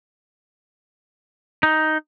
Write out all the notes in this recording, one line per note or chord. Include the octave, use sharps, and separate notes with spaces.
D#4